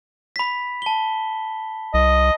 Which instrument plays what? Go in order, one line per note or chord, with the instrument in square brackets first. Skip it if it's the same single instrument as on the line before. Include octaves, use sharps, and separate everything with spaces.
[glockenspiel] B5 B6
A5 G7
[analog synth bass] C2 [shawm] D#5